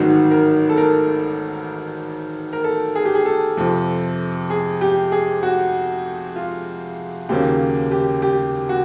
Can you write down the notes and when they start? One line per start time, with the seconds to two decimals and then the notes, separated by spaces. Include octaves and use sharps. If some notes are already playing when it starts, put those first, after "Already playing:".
Already playing: A1 G#2 D#3 F#3 F#4
0.31 A#4
0.69 A4
0.77 A#4
2.53 A#4
2.64 A4
2.95 G#4
3.05 G4
3.15 G#4
3.26 A4
3.57 F2 C3 F3
4.50 G#4
4.81 G4
5.12 G#4
5.43 F#4
6.36 F4
7.29 D#2 C#3 F#3 A#3 C#4 G4
7.91 G4
8.22 G4
8.69 F#4